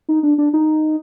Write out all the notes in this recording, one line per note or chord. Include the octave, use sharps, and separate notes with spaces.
D#4
D4
D4
D#4